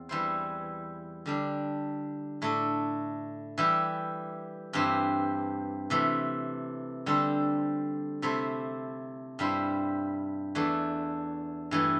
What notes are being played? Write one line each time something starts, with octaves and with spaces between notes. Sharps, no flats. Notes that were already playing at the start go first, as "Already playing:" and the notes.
Already playing: E2 C4
E3 G3 E4 C5
D3 G3 D4
A2 A3 D4 A4
E3 G3 E4 G4
G2 E3 C4 G4
C3 E3 A3
D3 G3 C4 A4 C5
C3 A3 E4 A4 C5
G2 G3 E4 C5
E2 E3 A3 D4
G2 E3 A3